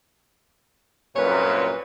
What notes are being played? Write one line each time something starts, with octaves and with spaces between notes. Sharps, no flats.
C2 F#2 A#2 B4 C#5